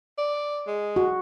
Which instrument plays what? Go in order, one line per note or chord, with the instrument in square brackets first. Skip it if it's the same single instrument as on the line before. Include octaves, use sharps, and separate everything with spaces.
[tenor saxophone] D5
G#3
[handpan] F#4